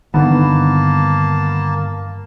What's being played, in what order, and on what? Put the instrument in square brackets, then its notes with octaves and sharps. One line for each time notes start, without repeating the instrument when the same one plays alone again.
[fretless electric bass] G2 D3 D#3 [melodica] A#3 A5 [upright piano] B3